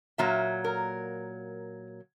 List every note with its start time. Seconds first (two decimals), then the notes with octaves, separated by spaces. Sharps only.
0.18 A#2 F#3 A#3 E5
0.64 A#4